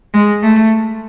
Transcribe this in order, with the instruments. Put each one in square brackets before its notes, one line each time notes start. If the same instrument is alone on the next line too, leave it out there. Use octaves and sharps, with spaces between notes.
[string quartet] G#3
A3